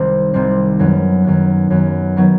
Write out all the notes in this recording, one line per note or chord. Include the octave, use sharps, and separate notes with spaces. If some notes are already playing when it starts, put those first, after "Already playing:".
Already playing: C2 C3 D#3 G3 C4
C2 C3 D#3 G3 C4
F#2 D#3 F#3 B3
F#2 D#3 F#3 B3
F#2 D#3 F#3 B3
D#3 F#3 B3